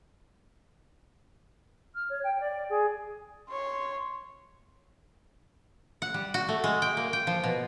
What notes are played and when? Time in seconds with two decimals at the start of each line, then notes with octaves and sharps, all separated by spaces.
1.95 F6
2.09 C#5
2.24 G5
2.40 D5
2.69 G#4
3.49 C#5 C6
6.02 F#5
6.14 G3
6.34 F#4
6.49 A3
6.64 G#3
6.82 G5
6.97 A#3
7.13 G5
7.27 F3
7.43 B2